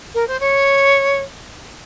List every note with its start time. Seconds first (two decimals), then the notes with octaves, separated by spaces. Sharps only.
0.14 A#4
0.27 C5
0.39 C#5